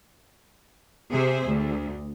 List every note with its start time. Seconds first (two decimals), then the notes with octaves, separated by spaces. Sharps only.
1.11 C3 G#4 C5 E5
1.46 D2